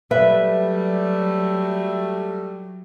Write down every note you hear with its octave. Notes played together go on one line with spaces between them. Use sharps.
F#3 G3 A3 B4 E5